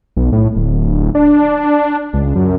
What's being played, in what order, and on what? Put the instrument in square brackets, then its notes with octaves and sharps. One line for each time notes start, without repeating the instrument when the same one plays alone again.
[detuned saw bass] B1
A2
D1
D4
C#2
F#2